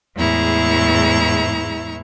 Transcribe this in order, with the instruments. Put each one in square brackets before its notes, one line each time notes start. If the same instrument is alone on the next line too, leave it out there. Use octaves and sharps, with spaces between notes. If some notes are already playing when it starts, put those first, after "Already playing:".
[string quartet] E2 A2 G#3 E4 A#5 C#6